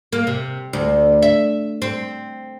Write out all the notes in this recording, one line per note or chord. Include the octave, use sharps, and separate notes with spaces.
A#3
C3
D2
E5
C4